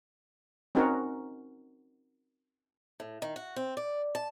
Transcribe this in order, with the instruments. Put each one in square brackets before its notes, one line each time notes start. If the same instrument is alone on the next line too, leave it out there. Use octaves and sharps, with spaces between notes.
[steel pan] C4 C#4 D#4 F#4 A#4
[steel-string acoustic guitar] A2
D#3
F#4
C4
D5
A5